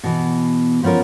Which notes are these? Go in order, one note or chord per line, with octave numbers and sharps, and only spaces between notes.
B2 E3
F3 B3 C#4 F4 A#4